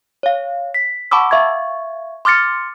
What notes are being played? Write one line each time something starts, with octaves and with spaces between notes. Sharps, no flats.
C#5 F5
B6
F#5 A5 B5 C#6 D6 E6
E5 F5 C#6 G#6
C6 D6 F6 A6 C#7